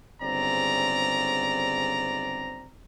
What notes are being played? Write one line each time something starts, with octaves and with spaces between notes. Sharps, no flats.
G1 G#2 C#3 C4 D5 A#5